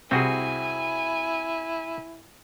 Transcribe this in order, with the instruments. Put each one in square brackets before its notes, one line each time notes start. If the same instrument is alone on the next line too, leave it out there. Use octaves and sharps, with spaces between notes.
[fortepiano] C2 [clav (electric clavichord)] C4 F#4 G#4 [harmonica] E4 [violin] G#5